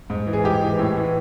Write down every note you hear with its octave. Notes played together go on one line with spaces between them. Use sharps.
G#2
E3
G#4
G#2 G4
E3
A2
E3